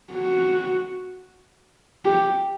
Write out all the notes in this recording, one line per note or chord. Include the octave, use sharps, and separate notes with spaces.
F#4
G4